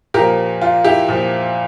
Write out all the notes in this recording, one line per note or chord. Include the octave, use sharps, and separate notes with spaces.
A#2 F3 G4 A#4
F4
E4 G4
A#2 F3